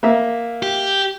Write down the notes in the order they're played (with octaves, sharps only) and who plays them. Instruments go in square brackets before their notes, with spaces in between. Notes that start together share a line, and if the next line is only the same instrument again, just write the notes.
[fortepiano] A#3 E5
[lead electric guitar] G4